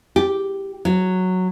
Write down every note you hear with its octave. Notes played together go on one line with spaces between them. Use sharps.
G4
F#3